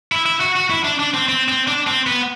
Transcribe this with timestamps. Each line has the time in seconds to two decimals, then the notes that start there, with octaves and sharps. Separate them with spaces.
0.12 E4
0.26 E4
0.40 F#4
0.56 F#4
0.70 E4
0.84 D4
0.99 D4
1.14 C4
1.29 C4
1.49 C4
1.68 D4
1.87 C4
2.07 B3